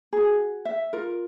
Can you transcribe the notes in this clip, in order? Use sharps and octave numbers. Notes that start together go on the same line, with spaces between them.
F#4 G#4
E5
F4 A#4